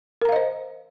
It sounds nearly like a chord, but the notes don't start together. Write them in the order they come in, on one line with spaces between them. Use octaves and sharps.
A#4 A#5 F5 D#5 C5